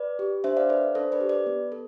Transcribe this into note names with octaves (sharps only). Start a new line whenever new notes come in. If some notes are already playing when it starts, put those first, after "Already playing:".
Already playing: B4 D5
G4
D4 C5 E5
D5 F5
A4 B4 D5
D4 A4 C5
B4 D5
G4
B4 D5
B3
A4